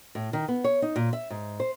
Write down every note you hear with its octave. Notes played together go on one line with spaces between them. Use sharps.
A2
D#3
B3
C#5
D#4
A#2
E5
G#2
C5